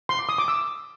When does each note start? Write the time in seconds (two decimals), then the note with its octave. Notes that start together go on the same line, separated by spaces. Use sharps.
0.09 C6
0.19 D6
0.29 D#6
0.38 D6
0.48 E6